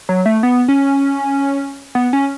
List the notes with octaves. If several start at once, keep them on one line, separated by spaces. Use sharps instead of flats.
F#3
A3
B3
C#4
B3
C#4